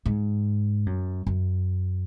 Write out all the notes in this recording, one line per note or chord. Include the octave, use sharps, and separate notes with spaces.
G#2
F#2
F#2